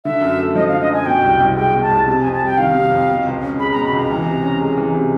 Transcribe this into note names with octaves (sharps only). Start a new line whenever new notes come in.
D3 E5
F#2
A3
F3 D#5
F5
D3
D#5
F#2 G#5
B2 G5
C2
C2
G#3 G5
B2
A5
C2
C3 A5
F2 G#5
A5
G3 G5
D#3 F5
C3
F2
B2
C#2
C#4
G#3 B5
A#5
B2
B5
C#2 A#5
E3
C3
C#4
G#3
E3
C3